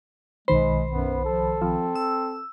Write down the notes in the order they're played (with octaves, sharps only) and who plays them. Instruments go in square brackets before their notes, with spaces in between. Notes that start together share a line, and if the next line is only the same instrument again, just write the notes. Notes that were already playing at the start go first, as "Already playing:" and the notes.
[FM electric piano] B1 D#3 B5 [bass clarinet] G#3 [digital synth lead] C5
[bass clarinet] F#2 [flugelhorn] B3
[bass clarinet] F3 [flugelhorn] A4
[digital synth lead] F3 [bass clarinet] C4
[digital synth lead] E6